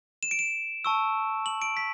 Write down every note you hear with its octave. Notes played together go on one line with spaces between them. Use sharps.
E7
D7
E7
A5 C#6 E6
F#7
D7
B6